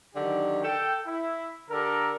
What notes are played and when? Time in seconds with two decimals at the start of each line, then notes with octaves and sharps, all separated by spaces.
0.15 D3 D#3 F#3 G4
0.63 A4 G5
1.06 E4
1.70 D3 G4 A4 A#4